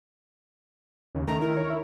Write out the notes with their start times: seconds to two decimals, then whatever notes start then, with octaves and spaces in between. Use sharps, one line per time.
1.15 D#2 C#3
1.28 D#3 A3 A#5
1.41 E4 A#4
1.56 C#5
1.70 E4